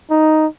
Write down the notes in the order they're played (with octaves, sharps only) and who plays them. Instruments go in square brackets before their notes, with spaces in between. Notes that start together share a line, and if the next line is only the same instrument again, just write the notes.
[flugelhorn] D#4